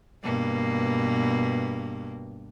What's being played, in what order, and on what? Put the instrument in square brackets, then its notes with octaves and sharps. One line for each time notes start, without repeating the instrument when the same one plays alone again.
[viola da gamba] G2 B2 A#3